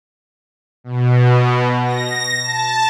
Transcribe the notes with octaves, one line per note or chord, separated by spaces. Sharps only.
B2
A#6
A5